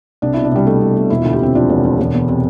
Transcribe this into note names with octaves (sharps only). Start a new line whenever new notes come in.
C2 D4
B2 E4
D4
C2 G3
B2 A3
C2
B2
E1 E4
D2 F4
G4
C3 C4
F3 D4
E1
D2
E1
E2
C3